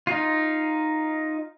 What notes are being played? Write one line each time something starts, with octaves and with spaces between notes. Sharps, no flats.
D#4 F4